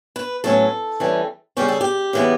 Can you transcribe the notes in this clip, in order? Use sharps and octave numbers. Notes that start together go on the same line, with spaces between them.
B4
A2 F#3 C#4 A4
E3 G3 C#4
C#3 G3 C#4 G4
A4
G4
C#3 E3 B3